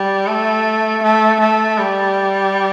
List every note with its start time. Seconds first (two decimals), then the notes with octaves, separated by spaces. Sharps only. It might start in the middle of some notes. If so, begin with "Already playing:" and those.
Already playing: G3
0.27 A3
1.03 A3
1.41 A3
1.78 G3